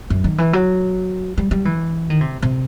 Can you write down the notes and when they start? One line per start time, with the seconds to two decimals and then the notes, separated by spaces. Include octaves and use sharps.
0.10 F#2
0.24 D#3
0.38 E3
0.53 F#3
1.37 G3
1.51 G3
1.65 E3
2.10 D#3
2.21 C3
2.42 C3